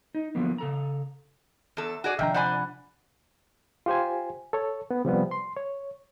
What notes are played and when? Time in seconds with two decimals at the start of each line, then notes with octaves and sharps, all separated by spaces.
0.15 D#4
0.35 D3 F3 F#3 A#3 B3
0.58 C#3 A4 A#5
1.77 E2 A4
2.04 F#4 G#4 D5
2.19 C3 D#3 F3 D4 E5 G5 A#5
2.34 C5 D5 F#5 G#5 B5 F#6
3.86 F4 G4 C5 G#5
4.53 A4 C#5
4.91 B3
5.05 C3 F3 G3 B3
5.31 C6
5.57 C#5